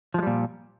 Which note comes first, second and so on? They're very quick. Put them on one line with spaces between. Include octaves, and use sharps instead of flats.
F3 G#3 G3 A#2